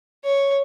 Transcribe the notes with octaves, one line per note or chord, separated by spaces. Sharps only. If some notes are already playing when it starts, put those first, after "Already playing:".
C#5